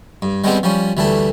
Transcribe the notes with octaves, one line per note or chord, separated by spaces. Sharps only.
G2
G3 G#3 B3 C4 D#4 G4
F3 G3 C#4
D2 E3 G3 A3 A5